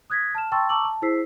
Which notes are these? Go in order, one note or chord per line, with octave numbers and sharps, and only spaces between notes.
D#6 F#6 G#6 A#6 B6
A5 F6 E7
G5 A5 C6 C#6 E6 A6
A5 A#5 C#6 D6 E6 F#7
A5
E4 G#4 C5 E6 B6 C7